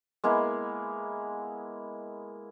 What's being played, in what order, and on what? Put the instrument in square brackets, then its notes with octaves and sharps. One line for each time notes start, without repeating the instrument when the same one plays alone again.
[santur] G#3 A#3 B3 E4